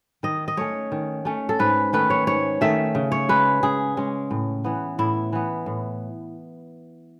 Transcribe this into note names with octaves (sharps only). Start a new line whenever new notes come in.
D#3 D#5
D#5
A3 C#4 C#5
D#3
A3 C#4
A4
G#2 B4
D#3 A3 C#4 B4
C#5
G#2 C#5
D#3 A3 C#4 E5
C#3
C#5
G#3 C#4 B4
C#3 G#4
G#3 C#4
A2
E3 B3
A2 E4
E3 B3
A2